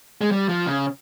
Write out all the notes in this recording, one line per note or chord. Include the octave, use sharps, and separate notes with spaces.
G#3
G3
F3
C#3